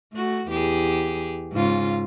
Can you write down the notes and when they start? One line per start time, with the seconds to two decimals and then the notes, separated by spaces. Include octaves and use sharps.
0.13 A3 F#4
0.49 E2 G4 G#4
1.52 G#2 C#3 F4